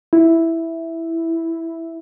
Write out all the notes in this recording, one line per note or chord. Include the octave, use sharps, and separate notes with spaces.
E4